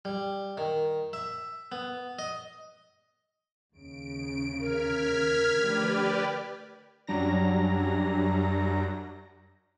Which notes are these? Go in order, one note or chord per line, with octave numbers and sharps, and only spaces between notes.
G3
D#3
E5
B3
D#5
D#2 C#3 D7
A#4 F6 G#6 B6
D3 F3 A3 G4 B4 D5
F#2 F#3 G3 D4 A#5 A#6